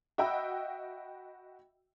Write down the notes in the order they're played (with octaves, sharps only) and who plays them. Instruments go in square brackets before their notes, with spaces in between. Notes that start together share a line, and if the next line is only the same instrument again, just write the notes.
[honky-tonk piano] F#4 D#5 E5 G5 B5 E6